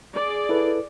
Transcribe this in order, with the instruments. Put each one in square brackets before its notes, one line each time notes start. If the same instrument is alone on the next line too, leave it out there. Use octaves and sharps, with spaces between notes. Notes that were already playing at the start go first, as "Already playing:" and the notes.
[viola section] G#4 D5
[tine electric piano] E4 A4 B4